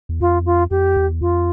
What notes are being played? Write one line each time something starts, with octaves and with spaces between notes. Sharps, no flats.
E2
F2 F4
F4
F2 G4
E2
F2 F4